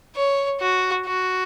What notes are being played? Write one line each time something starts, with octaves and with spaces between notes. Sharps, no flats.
C#5
F#4
F#4